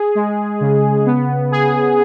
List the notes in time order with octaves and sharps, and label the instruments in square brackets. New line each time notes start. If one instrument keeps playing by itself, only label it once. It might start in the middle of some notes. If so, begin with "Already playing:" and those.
Already playing: [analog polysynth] G#4
G#3
C#3
B3
G#4